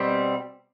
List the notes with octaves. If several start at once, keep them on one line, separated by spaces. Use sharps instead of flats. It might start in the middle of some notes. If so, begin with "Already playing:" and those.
Already playing: B2 G3 C4